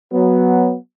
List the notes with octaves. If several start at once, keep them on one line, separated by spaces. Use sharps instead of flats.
F#3 B3